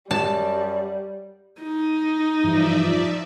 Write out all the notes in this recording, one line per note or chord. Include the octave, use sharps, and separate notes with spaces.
F#2 G3 A5
D#4
G2 E3 F3 D5 E5